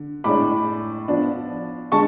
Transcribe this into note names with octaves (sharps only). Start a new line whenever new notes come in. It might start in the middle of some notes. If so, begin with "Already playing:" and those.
Already playing: D3
A2 G#3 D4 B5 D6
F3 B3 D4
D3 G#3 A5 C#6